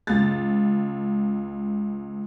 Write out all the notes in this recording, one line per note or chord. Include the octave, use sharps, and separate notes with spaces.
C#2 A6